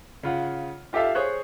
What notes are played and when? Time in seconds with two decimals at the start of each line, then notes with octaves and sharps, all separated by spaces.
0.23 C#3 F4 F#5
0.93 F4 G4 A4 E5 F5
1.15 G#4 C5 C#5 F#6